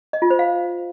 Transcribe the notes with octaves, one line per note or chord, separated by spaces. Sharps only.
D#5
F4
C5
F5